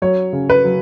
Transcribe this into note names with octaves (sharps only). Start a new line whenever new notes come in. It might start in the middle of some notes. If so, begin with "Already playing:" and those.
F#3 C#5
C#3
B4
F#3